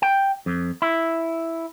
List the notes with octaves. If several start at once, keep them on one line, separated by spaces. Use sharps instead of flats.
G5
F2
E4